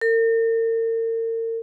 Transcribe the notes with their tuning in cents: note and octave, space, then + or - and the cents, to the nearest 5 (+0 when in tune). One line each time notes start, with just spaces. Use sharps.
A#4 -40